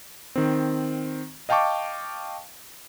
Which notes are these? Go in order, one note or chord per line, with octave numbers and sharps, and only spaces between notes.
D#3 C4
D#5 F5 G5 A5 C#6 D6